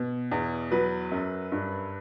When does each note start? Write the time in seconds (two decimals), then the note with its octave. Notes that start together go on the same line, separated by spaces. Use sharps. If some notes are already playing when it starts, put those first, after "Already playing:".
Already playing: B2
0.31 E2
0.71 F#3 B4
1.11 F#2
1.52 G2